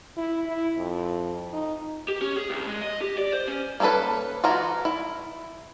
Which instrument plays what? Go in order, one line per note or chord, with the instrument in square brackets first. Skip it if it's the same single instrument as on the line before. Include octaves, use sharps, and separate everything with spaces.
[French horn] E4
E4
F2
D#4
[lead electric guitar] G4
C#4
G#4
C2
G#3
D#5
G4
D5
C5
C#4
[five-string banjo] A#3 C#4 F4 A4 B4
E3 G#3 F4 F#4 A#5
E4